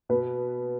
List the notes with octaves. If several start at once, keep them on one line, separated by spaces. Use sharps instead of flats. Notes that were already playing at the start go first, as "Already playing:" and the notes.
B2 B3 B4